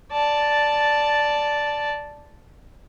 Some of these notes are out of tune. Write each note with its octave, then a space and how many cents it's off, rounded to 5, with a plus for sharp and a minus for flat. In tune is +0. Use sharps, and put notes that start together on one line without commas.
D5 +0 A5 +0